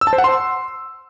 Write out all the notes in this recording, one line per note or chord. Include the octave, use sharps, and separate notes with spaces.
E6
A5
C5
F#5
C6